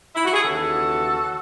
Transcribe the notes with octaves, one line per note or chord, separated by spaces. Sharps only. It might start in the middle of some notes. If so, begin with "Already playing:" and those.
E4
F#4
G#4
D#2 C#3 E3 F#4 A4